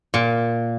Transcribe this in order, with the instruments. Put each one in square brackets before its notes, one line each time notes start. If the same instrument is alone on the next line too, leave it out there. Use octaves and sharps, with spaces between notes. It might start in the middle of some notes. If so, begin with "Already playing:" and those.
[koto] A#2